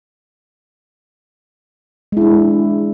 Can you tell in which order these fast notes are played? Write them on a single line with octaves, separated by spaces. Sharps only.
G#3 E4 D4